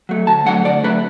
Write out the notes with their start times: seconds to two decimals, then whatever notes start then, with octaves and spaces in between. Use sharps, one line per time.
0.09 F#3 A3
0.27 D2 A5
0.46 D3 F#3 A3 F#5
0.65 D2 D5
0.84 D3 F#3 A3 B4